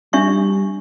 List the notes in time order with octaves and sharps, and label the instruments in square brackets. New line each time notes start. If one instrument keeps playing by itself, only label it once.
[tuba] G3 [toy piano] D4 E5 C#6